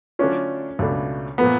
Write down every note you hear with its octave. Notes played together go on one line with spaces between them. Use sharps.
D3 F#3 A3 C#4 D4 F4
C#2 B2 F#3 A3 D4
A#2 F3 A3 B3